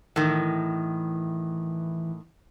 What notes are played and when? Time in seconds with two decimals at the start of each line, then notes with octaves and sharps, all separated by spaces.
0.16 A2 D#3 E3